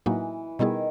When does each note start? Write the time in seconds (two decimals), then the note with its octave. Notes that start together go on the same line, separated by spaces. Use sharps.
0.06 A2 E3 F#3 A#3 D#4 F#4
0.59 B2 D#3 G3 B3 E4 G#4